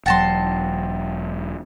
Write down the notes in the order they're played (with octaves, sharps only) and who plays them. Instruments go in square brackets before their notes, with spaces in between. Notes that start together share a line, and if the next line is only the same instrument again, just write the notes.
[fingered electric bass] E1 F#3 [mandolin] F#5 A5 C6 [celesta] G5 A6 A#6